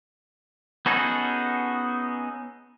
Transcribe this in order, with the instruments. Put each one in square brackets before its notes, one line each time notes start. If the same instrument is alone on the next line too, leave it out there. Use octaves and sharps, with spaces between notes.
[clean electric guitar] B3 C#4 D#4 F#4 G#4 A4